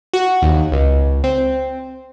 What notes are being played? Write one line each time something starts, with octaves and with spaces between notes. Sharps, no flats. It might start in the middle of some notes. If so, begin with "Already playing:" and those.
F#4
D#2
C#2
C4